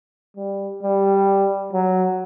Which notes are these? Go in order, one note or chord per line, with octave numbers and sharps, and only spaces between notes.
G3
G3
F#3